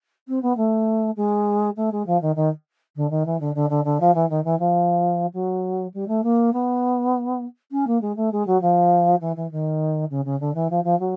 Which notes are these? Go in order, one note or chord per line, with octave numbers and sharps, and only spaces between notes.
C4
B3
A3
G#3
A3
G#3
F3
D#3
D#3
D3
D#3
E3
D3
D3
D3
D3
F3
E3
D#3
E3
F3
F#3
G3
A3
A#3
B3
C#4
A#3
G#3
A3
G#3
F#3
F3
E3
E3
D#3
C#3
C#3
D3
E3
F3
F3
F#3